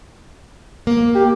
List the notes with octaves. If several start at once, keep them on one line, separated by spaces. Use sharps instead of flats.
A#3
G4